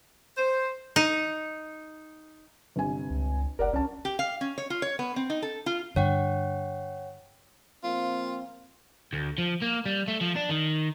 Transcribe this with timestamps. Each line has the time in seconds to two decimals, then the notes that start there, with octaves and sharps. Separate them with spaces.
0.37 C5
0.96 D#4
2.76 G1 C3 G#5
3.10 C#2
3.59 F#1 A#4 D5 F#5
3.73 C2 C#4 A5
4.05 G4
4.19 F5
4.41 C#4
4.58 C#5
4.70 F4
4.82 C#5
4.99 B3
5.16 C4
5.30 D#4
5.42 A4
5.66 F4
5.96 G2 D3 C#5 F#5 G5
7.83 F3 A#3 C4 F4
9.13 D2
9.38 F3
9.62 A#3
9.86 G3
10.08 A3
10.21 F3
10.36 D4
10.49 D#3